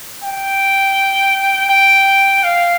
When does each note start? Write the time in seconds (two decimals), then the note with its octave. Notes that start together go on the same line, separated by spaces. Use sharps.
0.23 G5
1.70 G5
2.43 F5